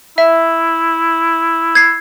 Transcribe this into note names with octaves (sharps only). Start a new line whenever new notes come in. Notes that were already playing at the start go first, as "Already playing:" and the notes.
E4 E5
G#6 C7